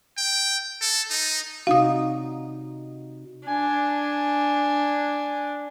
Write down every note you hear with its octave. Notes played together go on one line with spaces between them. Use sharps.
G5
A4
D#4
C3 D#4 F#4 F5 D#6
D4 G#5